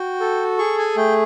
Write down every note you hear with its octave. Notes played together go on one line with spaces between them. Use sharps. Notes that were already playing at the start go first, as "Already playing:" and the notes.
Already playing: F#4 G5
A4
G#4 C#6
G#5
A3 G5